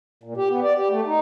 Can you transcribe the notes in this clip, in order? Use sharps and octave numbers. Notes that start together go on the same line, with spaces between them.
A#2
G4
B3
D5
G4
A3
D#4